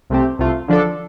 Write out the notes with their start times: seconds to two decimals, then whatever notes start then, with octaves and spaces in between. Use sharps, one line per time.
0.10 C2 C3 A3 C4 G4
0.39 C2 C3 A3 F4
0.68 D3 F3 D4 A4